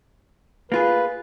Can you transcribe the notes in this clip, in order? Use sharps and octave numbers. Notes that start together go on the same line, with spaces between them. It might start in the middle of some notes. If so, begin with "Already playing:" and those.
A#3 F4 G#4 B4